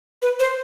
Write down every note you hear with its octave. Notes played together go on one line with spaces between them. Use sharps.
B4
C5